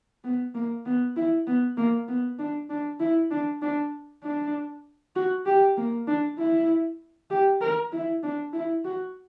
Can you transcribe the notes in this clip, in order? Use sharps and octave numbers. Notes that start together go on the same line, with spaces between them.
B3
A#3
B3
E4
B3
A#3
B3
D4
D4
E4
D4
D4
D4
F#4
G4
A#3
D4
E4
G4
A#4
E4
D4
E4
F#4